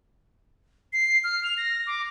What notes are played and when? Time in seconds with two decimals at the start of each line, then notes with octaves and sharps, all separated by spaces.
0.93 C7
1.24 F6
1.43 F7
1.57 A#6
1.87 D6